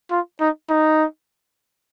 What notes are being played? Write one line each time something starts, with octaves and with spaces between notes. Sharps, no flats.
F4
D#4
D#4